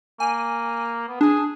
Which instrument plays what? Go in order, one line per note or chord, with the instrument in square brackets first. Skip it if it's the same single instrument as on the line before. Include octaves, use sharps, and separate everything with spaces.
[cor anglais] A#3 [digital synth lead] G#5
[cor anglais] B3
[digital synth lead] D4 [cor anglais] G#4